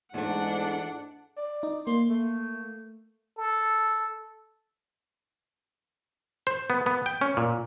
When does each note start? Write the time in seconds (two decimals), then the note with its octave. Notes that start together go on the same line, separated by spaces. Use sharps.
0.14 E2 G#2 A3 D4 F#5
1.37 D5
1.63 D#4
1.87 A#3 C6
2.09 A3
3.38 A4
6.47 C5
6.70 B3
6.86 B3
7.06 G5
7.21 C#4
7.37 A#2